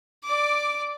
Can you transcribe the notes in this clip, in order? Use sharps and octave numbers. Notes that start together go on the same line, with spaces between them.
D5 D6